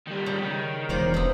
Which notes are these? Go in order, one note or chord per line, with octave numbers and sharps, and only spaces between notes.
D#3 G3
C#3
D#3
E1 F4 C5 D5
C3 B3